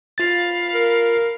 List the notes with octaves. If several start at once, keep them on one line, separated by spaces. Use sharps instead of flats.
F4 F5 B5 A6
A#4